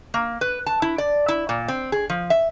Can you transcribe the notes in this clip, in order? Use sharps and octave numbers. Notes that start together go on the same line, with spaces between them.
A#3
B4
A5
E4
D5
E4
A#2
C4
G#4
F3
E5